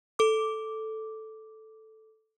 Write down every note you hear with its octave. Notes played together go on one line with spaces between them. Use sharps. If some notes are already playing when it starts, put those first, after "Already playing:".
A4 D6